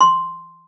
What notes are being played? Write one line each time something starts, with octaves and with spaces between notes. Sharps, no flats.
C6